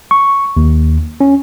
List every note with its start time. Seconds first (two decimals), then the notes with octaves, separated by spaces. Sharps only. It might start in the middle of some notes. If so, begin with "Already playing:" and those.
0.11 C#6
0.57 D#2
1.21 C#4